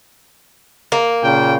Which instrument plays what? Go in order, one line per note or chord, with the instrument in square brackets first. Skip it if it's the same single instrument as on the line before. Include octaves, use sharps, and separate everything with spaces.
[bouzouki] A#3
[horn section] A#2 C#3 G5